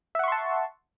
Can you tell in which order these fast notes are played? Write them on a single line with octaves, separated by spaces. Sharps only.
E5 F#5 C#6 C6 A5